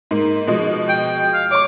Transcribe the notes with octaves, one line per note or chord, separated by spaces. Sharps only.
G#2 A#3
B2 F3 G#3
G5
F5
C#5 C#6 D6